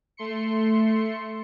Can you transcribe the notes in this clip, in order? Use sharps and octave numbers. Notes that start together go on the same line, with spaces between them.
A3 C6 C#7